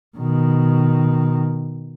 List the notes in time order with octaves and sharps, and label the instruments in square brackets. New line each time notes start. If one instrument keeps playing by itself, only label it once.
[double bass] B2 D#3